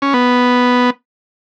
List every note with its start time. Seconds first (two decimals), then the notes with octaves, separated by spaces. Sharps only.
0.02 C#4
0.13 B3